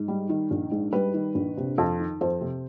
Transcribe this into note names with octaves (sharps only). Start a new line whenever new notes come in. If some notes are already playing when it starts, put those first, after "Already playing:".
Already playing: G#2
G3
D#3
A#1
G#2
G3 B4
D#3
A#1
C3
F2
D#3
F2 C5
C3